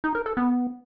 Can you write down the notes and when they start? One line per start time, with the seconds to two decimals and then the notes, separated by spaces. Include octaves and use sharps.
0.04 D#4
0.15 A#4
0.26 A4
0.37 B3